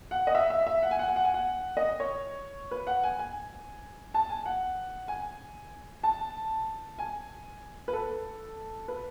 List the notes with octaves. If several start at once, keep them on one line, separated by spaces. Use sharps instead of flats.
F#5
D#5
E5
E5
E5
F#5
G#5
F#5
G#5
F#5
G#5
F#5
D#5
C#5
B4
F#5
G#5
G#5
A5
G#5
F#5
G#5
A5
G#5
B4
A4
B4